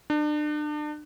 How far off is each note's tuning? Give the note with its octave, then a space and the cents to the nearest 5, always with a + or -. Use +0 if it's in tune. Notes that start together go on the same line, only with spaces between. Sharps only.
D4 +35